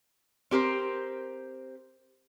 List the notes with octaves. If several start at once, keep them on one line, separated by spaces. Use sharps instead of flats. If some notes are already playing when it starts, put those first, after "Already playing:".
C4 G4 A#4 C5